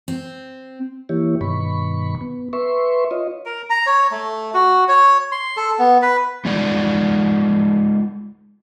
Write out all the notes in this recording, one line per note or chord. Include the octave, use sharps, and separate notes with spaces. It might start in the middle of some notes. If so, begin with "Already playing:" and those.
C4
E3 A#3 E4 G4 C#5
G2 B2 D#3 B5 C#6
B3
B4 E5 C6 C#6
F4 C#5 D#5
A#4
A#5
C#5
A3
F#4
C#5
C6
A4
B3
B4
G#3 D#4 F4 D5 F#5